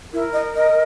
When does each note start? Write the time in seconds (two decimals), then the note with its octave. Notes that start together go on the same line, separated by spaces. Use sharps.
0.13 E4 A#4
0.33 D#5
0.55 D#5